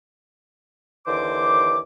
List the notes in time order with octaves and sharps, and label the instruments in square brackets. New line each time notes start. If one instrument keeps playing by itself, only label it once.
[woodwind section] D#2 D3 E3 C5 D6